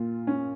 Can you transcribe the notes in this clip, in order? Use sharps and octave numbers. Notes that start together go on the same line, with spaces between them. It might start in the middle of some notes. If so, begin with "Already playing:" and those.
Already playing: A#2 F4
C#4